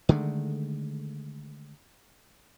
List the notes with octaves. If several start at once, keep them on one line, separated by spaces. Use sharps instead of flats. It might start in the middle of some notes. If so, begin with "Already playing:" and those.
D3 D#3 G#3 A3